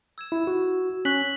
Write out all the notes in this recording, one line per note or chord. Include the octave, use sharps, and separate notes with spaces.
E6 G#6 E7
E4
F#4
C#4 C#6 F#6 B6 F#7